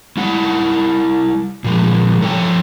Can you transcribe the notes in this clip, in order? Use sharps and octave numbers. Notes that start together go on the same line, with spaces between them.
G3 E4 F#5
A#2 F3 G#3
F3 A4 C#5 G5